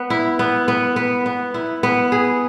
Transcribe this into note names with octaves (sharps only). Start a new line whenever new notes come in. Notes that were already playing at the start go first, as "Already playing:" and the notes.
Already playing: B3
E4
B3
B3
B3
B3
E4
B3
G#4